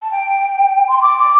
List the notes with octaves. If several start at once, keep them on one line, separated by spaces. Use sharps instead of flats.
A5
G5
C6
D6
D6